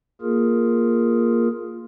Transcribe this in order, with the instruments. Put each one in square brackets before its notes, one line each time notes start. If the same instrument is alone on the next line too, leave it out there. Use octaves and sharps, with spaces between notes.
[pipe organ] A#3 F4 G#4 A#4